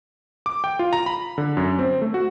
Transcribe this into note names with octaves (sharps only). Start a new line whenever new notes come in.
D6
G5
F4
A#5
B5
D3
F#2
C4
A3
F#4